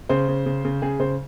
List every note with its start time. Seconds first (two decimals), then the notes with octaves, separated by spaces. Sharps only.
0.09 C#3 C5
0.28 C#3
0.46 C#3
0.65 C#3
0.82 C#3 G#4
1.00 C#3 C5